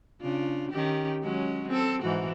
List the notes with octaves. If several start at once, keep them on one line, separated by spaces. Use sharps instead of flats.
C#3 D4 F4
D#3 C#4 G4
F#3 G#3 C#4
C4 A4
G#2 E3 F#4